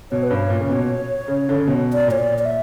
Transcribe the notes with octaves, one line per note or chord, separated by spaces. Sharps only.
B2 C#5
B4
G2 C#5
A#2
C#3
B2
C#3
D3
C#3
B2
D5
A#2 C#5
D5
D5
E5